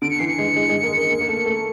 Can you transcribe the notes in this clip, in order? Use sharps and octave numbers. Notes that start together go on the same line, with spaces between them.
D3 D7
C#7
E3 C7
C#7
G#3
G#3
G#3
A#3
A#3
A#3
A#3
A3
A3